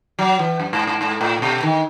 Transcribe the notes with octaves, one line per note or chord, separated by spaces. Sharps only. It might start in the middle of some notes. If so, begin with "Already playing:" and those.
F#3
E3
F#2
G#2
G#2
G#2
A2
B2
D#3